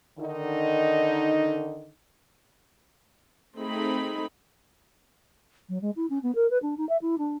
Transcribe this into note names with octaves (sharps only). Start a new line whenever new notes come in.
D3 D#3 D#4
A3 C4 D#4 G#4 B5
F#3
G#3
E4
C#4
B3
A#4
B4
D4
D#4
E5
E4
D4